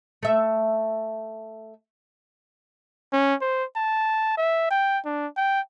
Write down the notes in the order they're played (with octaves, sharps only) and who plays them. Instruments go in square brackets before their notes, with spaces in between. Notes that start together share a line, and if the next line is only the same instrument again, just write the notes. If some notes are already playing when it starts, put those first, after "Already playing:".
[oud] A3 E5
[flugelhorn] C#4
C5
A5
E5
G5
D4
G5